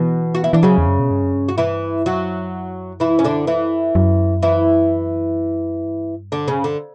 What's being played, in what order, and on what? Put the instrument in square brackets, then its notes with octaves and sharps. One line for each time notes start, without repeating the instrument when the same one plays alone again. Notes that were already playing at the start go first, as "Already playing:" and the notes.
Already playing: [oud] B2 B3 [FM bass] E3
[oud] F#4
E4
[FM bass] E3 [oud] D4
[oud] C#3 C#4 [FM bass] F#3
[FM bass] E2
F#2
B2
G2
F#2
G2
[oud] F#4
E3 E4
[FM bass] F#2 [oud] F#3 F#4
[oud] E3 E4
C#4
D3 D4
E3 E4
[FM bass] F#2
[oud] E3 E4
[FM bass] G2
[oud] D3 D4
C#3 C#4
D3